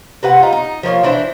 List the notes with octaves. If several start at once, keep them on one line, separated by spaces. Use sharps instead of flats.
C3 B4 F#5
D#4 F4
D#4
F3 A#3 F4 C#5
E3 D4 E4 C5